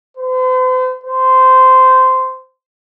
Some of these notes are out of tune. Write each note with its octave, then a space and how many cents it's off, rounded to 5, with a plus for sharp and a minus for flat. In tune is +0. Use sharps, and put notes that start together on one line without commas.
C5 -40
C5 -15